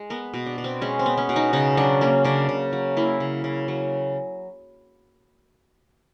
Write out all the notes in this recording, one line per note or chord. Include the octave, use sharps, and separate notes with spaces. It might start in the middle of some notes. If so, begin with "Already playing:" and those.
Already playing: G#3
B3 A#4
B2
D4
B2
C4
G#3 C#4
C4
B3
C#4
B2
D#4
C#3 D#4
F#3 D4
A#3 C#4
C#3 D4
C#3
F#3
A#3 E4
C#3
C#3
F#3